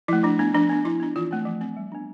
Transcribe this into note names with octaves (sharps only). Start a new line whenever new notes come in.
F3 A3 E4
F3 D4
B3 D4
F3 D4
B3 D4
F3 E4
B3 D4
E3 F4
A3 C4
F3
C4
G3
B3 D4